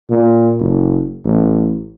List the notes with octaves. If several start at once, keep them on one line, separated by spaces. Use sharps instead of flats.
A#2
F#1
A1